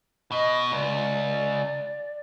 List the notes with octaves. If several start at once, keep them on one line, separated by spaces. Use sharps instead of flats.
B2 D#5
C#2 D5